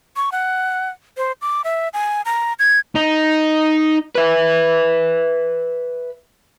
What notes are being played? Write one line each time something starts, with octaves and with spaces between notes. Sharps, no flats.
C#6
F#5
C5
D6
E5
G#5
A#5
G#6
D#4
B4 E5